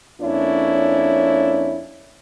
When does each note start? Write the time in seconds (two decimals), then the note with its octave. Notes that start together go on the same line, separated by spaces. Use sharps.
0.22 F2 A#3 C#4 D4 E4 C#5